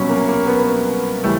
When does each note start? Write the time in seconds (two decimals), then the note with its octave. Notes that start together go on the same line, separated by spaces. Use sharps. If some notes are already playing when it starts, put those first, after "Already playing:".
Already playing: C2 B2 F#3 C#4
0.09 A#3
0.28 A#3
0.47 B3
1.23 C#3 E3 G3 A3